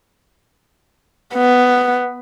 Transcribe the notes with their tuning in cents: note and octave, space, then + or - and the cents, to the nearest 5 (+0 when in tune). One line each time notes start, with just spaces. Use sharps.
B3 +5